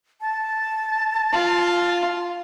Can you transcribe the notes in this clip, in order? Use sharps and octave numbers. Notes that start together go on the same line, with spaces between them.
A5
F4